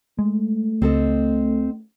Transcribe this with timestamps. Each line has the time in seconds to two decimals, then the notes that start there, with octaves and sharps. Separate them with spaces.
0.19 G#3 A3
0.82 C#2 C4 A4 D#5